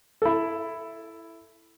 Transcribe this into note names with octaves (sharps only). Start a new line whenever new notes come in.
E4 A4